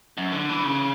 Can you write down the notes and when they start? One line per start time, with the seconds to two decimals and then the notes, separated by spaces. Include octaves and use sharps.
0.18 F#2
0.32 D3
0.49 E3
0.64 C#3